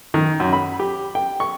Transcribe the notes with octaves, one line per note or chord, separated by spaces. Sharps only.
D#3
F#2
B5
G4
G5
C#6